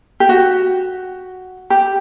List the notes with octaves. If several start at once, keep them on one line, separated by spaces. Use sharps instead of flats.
G4
F#4
G4